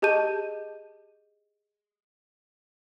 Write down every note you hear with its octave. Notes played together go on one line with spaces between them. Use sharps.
G4 G#4 D#5 A5 G6 D#7